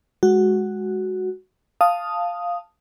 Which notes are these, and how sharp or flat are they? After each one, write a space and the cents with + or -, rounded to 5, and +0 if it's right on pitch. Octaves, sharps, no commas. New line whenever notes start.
G#3 +0 F#4 +5
F5 +0 A5 +0 D#6 +0